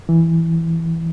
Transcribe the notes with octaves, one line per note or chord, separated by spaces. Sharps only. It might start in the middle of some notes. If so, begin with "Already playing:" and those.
E3